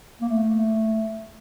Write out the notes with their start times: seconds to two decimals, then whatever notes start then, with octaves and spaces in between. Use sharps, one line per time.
0.21 A#3
0.29 A3